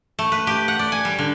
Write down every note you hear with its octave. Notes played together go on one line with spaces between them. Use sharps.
A3
B4
G4
F#5
D5
G#5
G3
D3